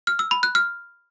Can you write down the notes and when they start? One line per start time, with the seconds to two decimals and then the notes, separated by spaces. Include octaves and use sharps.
0.07 F6
0.19 E6
0.31 B5
0.43 F#6
0.55 F6